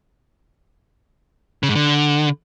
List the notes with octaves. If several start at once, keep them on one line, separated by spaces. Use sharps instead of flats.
C#3
G#2
D3